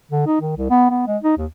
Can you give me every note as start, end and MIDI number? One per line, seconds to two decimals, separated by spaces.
0.11 0.24 50
0.27 0.39 63
0.41 0.56 51
0.57 0.69 36
0.70 0.90 59
0.90 1.05 59
1.07 1.17 56
1.23 1.34 63
1.37 1.46 39